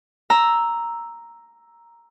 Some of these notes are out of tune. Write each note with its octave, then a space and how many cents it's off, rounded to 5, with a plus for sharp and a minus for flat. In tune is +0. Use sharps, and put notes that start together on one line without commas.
A#5 +0 E6 +0